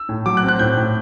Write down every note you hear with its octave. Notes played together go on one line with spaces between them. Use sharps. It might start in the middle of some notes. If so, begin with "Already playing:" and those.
Already playing: E6
A2
F#3 D6
F#6
C4
F#6
A2 G6
A2